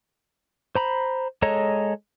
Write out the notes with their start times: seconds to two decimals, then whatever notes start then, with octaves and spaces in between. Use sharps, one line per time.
0.75 C5 A#5 B5
1.42 G#3 A4 C#5 D#5 A#5